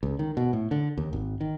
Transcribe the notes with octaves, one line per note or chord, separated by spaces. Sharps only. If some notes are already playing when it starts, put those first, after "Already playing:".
C#2
D#3
B2
A2
D3
D#2
G#1
D#3